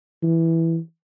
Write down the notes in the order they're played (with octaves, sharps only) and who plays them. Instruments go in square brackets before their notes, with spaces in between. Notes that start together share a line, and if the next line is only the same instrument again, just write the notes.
[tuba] E3